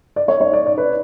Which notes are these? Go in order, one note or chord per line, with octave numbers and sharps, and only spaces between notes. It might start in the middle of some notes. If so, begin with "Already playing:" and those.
D5
C#5
C#5
D5
D5
B4